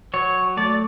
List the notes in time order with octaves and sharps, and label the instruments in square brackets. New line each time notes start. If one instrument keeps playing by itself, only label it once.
[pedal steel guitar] F#3 C#5
A3 D5